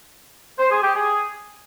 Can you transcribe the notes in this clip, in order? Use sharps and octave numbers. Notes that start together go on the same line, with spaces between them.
C5
G#4
G4
G#4